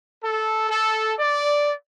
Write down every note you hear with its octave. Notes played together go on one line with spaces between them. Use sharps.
A4
A4
D5